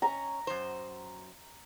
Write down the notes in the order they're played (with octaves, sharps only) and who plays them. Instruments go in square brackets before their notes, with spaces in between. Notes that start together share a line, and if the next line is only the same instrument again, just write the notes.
[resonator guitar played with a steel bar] C#4 [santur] A#5
[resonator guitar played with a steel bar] F#2 C5